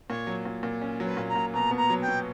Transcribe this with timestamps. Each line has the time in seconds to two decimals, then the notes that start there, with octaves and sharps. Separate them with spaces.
0.09 A#2 C#5
0.27 F#3
0.45 A#2
0.63 A#2
0.81 C#4
1.00 F#3
1.06 B4
1.17 A#2
1.29 A#5
1.35 A#2
1.54 B2 A#5
1.71 B3
1.77 A#5
1.90 F#3
2.02 G5
2.08 B2